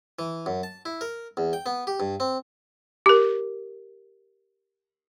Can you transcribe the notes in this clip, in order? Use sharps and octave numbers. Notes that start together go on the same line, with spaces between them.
E3
F#2
A5
E4
A#4
E2
G5
B3
G4
G2
C4
G4 A#4